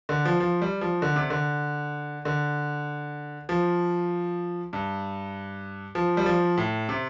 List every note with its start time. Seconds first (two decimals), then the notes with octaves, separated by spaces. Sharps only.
0.09 D3
0.25 F3
0.40 F3
0.62 G3
0.81 F3
1.02 D3
1.16 C3
1.30 D3
2.25 D3
3.49 F3
4.73 G2
5.95 F3
6.17 G3
6.26 F3
6.57 A2
6.89 C3